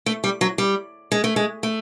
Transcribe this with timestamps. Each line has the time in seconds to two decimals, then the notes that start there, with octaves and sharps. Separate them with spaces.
0.06 A3
0.24 G3
0.41 F#3
0.58 G3
1.12 G#3
1.24 A3
1.36 G#3
1.63 A3